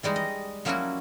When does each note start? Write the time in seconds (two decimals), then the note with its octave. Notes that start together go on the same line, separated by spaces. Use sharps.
0.03 E3 G3 G#3 D#4
0.16 D#5
0.65 F3 F#3 A#3 C#4 E4 F#4